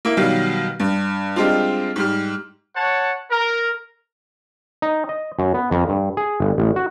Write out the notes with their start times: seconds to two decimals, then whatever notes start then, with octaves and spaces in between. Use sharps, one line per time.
0.05 A#3 E4
0.17 B2 D#3 F#3 G3 F5
0.80 G2
1.36 G3 G#3 C4 D4 F4
1.96 G#2 G3 F6
2.75 C#5 F#5 A5
3.30 A#4
4.82 D#4
5.09 D#5
5.39 F#2
5.54 B3
5.71 F2
5.89 G2
6.17 G#4
6.40 G1
6.58 A1
6.76 F#4